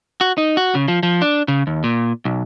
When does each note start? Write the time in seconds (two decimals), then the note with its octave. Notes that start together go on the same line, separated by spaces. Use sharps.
0.21 F#4
0.38 D#4
0.57 F#4
0.75 C#3
0.88 F3
1.03 F3
1.22 D4
1.48 C#3
1.67 D#2
1.84 A#2
2.25 B1